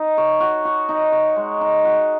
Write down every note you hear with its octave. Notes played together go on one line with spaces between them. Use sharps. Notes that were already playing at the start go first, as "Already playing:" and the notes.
Already playing: D#4
C#5
F#4
F#4
D#4
C#5
G#3
D#4
F#4